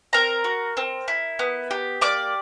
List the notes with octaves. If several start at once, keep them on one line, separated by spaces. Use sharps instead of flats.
C4 A#4 A#5
F#4
C4
E4
B3
G4
A#3 D5 D6